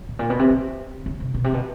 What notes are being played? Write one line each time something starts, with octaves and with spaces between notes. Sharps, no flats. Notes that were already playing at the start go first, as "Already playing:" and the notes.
Already playing: C#3
A2
A#2
B2
C3
C#3
C#3
C3
B2
C3
B2